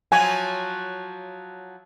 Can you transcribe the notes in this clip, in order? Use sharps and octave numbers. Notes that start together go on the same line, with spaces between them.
F3 F#3 F#4 G#5